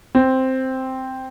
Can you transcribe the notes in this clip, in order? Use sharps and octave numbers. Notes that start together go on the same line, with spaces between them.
C4